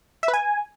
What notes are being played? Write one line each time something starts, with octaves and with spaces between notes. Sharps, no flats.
E5
B4
G#5